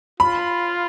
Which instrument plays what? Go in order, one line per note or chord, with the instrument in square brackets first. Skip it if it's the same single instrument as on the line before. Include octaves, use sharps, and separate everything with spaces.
[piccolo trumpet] F4 [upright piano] B5